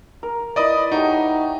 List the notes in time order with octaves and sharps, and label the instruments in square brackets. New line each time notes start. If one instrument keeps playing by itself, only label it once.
[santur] A#4
[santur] E4 B4 B5 [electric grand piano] D5 D#5 D#6
[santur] F#3 A3 G4 [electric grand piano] D#4